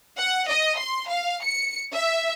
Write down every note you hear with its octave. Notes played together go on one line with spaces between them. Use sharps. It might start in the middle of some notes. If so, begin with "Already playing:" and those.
F#5
D#5
C6
F5
C#7
E5